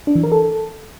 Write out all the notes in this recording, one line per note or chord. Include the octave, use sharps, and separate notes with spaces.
D4
E3
A#4
A4